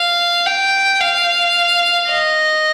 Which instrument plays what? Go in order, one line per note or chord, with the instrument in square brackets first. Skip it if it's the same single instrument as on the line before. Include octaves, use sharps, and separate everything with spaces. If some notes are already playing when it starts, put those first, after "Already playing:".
Already playing: [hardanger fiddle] F5
G5
F5
D#5